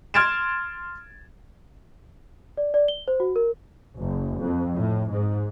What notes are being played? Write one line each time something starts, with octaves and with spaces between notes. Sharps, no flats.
C6 F6 G#6 A6 D7 E7
D5
D5
G7
C5
F#4
A#4
F#1
F2
A2
G#2